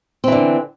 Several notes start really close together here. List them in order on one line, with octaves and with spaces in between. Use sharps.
C4 E3 D3